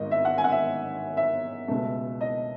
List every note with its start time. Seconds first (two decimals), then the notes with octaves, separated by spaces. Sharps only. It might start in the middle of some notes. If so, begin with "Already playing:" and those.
Already playing: G#1 G#2 D#3 G#3 D#5
0.11 E5
0.25 F#5
0.38 G#5
0.44 F#5
0.52 E5
1.17 E5
1.68 C#2 B2 A3
2.21 D#5